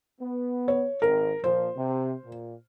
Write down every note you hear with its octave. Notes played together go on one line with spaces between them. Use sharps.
B3
C#5
G#1 C4 A#4
A#2 F3 C5
C3
A#2